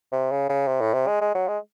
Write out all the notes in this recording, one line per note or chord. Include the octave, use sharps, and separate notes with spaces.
C3
C#3
C#3
C3
A2
C3
G#3
G#3
F#3
G#3